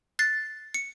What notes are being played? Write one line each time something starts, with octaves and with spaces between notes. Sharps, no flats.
F#6 A6 C7
C#7